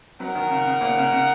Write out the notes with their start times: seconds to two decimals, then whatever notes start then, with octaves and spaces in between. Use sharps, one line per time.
0.20 F#3 D#4 A#4 F#5
0.35 D#3
0.50 C#3
0.66 C#3
0.81 A#2
0.97 C#3
1.13 C#3